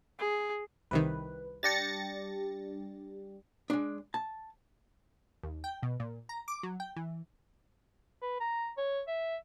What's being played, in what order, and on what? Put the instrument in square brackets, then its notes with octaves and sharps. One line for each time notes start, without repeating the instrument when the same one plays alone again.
[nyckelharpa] G#4
[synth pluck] C2 C3 D#3 [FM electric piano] B4
[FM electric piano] G3 D4 G4 [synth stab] A6 A#6 C#7
[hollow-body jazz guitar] G#3 D4
A5
[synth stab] D#2
G5
B2
A#2
A#5
D6
F#3
G5
E3
[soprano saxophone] B4
A#5
C#5
E5